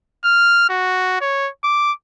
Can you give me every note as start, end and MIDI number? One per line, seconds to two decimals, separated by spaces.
0.24 0.64 89
0.69 1.18 66
1.21 1.49 73
1.64 1.92 86